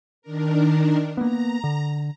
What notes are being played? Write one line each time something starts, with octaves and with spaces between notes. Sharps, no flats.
D#3 D4 A#4
A#3 B3 A#5
D3